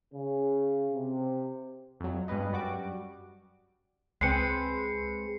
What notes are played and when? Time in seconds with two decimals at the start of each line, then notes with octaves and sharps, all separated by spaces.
0.13 C#3
0.93 C3
2.00 F2 F#3
2.28 G2 B2 G#3 B4 D#5
2.52 F#2 G3 F#4 D6
4.21 C#2 G#3 C4 B4 C7 C#7